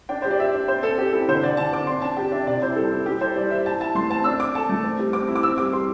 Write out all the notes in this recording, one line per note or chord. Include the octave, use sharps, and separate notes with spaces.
D4 G5
G4 C5
D5
G4 E5
D4
C4 C5
C4 A4
C4 G4
E4 A4
D3 C5
D3 D5
D3 A5
C4 D6
D4 C6
D4 A5
G4 G5
D4 E5
C3 D5
E4 C5
G3 A4
E4
G3 G4
A4 C5
G3 D5
C5 E5
E4 A5
E4 A5
A3 C6
C4 A5
D4 E6
D4 D6
A4 A5
A3
C4
G3
C4 D6
E4
D6
C4 E6
G3 D6
G3 C6